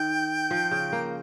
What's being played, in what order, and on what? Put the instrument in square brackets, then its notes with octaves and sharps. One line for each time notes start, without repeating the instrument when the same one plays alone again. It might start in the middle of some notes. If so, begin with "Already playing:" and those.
Already playing: [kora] D#3 [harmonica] G5
[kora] F3
C#3
A#3